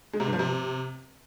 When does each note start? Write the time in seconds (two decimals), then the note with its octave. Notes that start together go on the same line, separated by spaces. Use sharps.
0.13 G#3
0.20 C3
0.26 G2
0.33 F3
0.39 C3